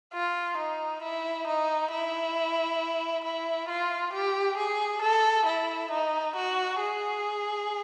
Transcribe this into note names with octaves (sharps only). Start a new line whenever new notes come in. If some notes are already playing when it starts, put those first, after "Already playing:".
F4
D#4
E4
D#4
E4
E4
F4
G4
G#4
A4
E4
D#4
F#4
G#4